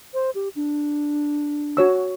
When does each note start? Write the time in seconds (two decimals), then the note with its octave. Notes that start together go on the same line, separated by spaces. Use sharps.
0.14 C5
0.35 G4
0.56 D4
1.77 F#4 C#5 E6